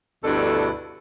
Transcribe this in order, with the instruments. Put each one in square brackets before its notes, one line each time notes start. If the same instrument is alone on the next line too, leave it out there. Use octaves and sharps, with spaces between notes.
[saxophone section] D2 G2 B2 D4 E4 A4